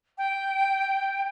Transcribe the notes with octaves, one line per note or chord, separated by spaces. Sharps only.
G5